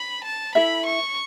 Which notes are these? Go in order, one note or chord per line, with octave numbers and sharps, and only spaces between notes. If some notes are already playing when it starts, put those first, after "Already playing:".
Already playing: B5
A5
E4 A4 E5 B5
C#6